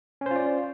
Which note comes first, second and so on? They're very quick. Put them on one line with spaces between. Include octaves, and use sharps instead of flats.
C#4 C5 F4 D5